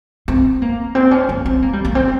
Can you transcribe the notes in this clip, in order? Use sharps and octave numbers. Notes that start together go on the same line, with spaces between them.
C4
A#3
C4
C#4
A#3
C4
A#3
G3
A#3
C4